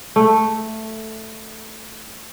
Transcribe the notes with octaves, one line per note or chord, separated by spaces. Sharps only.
A3